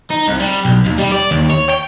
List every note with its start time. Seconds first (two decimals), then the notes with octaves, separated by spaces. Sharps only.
0.11 D#4
0.28 C2
0.40 G3
0.65 B1
0.85 D#2
0.98 G3
1.12 D5
1.31 D#2
1.50 C#5
1.70 G5